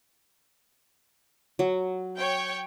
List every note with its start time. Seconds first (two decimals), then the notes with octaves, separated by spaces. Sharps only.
1.59 F#3
2.18 C#5 G5